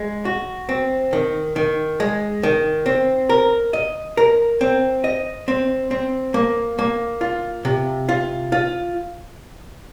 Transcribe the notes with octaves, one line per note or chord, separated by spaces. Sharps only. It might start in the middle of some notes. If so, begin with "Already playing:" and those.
Already playing: G#3
F#4
C4
D#3
D#3
G#3
D#3
C4
A#4
D#5
A#4
C4
D#5
C4
C4
A#3
A#3
F4
C3
F4
F4